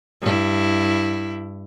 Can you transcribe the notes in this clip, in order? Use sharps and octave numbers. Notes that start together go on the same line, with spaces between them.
G2 E4